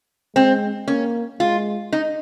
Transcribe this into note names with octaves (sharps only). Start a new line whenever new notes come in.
G#3 C4
A#3 C#4
G#3 F4
D#4